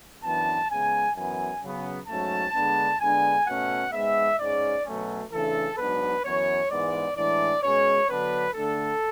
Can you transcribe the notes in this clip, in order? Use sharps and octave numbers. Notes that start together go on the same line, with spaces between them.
F#2 E3 B3 D4 A5
C#3 G#3 B3 G#5
F#2 E3 B3 G#5
C#3 F#3 B3
G#2 F#3 A3 C#4 A5
D3 G#3 B3 D4
D3 G#3 B3 D4 G#5
B2 A3 C#4 F#5
G#2 G#3 B3 E5
G#2 G#3 C#4 D5
B2 F#3 A3 C#4
C#3 E3 A3 D4 A4
G#2 F#3 B3 D4 B4
F#2 E3 B3 C#5
G#2 E3 G#3 B3 D5
A2 E3 G#3 D4 D5
B2 G#3 C#4 C#5
D3 F#3 B3 D4 B4
D3 A3 D4 A4